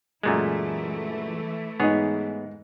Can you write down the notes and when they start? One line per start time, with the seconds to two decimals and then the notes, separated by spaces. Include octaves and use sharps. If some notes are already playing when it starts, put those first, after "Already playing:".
0.23 F#2 A#2 E3 G#3 A3 E4
1.80 G#2 B3 D#4 G#4 C#5